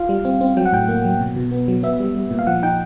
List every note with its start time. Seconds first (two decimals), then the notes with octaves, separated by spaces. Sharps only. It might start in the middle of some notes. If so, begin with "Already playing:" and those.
Already playing: F4 F5
0.09 G3
0.25 C4
0.41 C4
0.57 F#3 G5
0.65 F#5
0.73 A2 G5
0.88 A#3
1.05 F#3
1.21 B2
1.36 B2
1.51 B3
1.68 F#3
1.83 B3 E5
2.00 G3
2.15 G3
2.31 A#2
2.39 F5
2.47 F3 F#5
2.63 D#4 G5